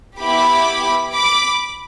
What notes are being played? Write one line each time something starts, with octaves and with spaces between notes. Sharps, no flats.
B3 E4 G4 B5 D6
B5 D6